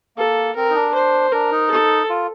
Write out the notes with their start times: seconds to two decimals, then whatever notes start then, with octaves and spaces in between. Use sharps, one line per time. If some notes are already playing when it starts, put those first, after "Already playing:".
0.17 A#3 A4
0.56 C4 A#4
0.70 D#4
0.75 D4
0.94 C5
1.32 D4 A#4
1.51 D#4
1.71 A4
2.10 F4